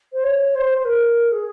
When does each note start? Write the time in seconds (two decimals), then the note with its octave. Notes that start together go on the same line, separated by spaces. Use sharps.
0.12 C5
0.23 C#5
0.55 C5
0.78 C5
0.85 A#4
1.31 G#4